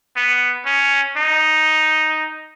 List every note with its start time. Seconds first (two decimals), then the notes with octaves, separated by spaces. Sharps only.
0.16 B3
0.66 C#4
1.17 D#4